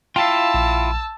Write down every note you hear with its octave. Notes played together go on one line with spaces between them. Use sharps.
E4 F4 F5 G5 A5 E6
A#1